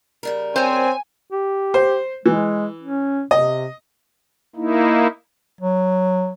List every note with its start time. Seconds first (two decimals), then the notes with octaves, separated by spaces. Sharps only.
0.23 C#3 G3 A#4
0.56 C4 C5 C#5 G#5
1.30 G4
1.74 C5
2.26 E3 G#3
2.82 C#4
3.31 C3 D#5
4.56 A#3 D#4 E4
5.61 F#3